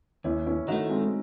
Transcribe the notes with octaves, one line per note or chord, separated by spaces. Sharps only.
D#2 C#4 E4
C#4 E4
D#3 A3 D#4 F#4
G#3 C4